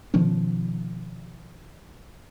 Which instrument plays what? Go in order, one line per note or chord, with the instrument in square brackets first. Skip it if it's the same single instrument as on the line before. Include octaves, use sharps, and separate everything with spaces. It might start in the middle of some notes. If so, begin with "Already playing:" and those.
[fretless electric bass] B2 D#3 F3 C#4